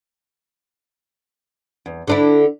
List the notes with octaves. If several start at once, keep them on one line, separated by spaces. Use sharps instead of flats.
E2
D3 D4 E4